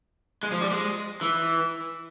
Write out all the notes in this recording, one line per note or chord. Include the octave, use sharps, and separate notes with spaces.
G#3
F3
G3
G#3
E3